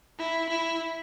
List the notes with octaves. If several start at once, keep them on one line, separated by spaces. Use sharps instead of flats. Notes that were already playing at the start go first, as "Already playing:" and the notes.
E4
E4